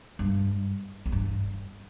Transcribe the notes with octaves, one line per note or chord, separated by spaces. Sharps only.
G2
E2
G2